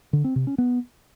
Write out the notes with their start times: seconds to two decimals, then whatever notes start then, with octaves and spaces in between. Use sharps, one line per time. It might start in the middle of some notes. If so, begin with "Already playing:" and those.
0.13 D3
0.24 C4
0.36 C3
0.47 C#4
0.58 B3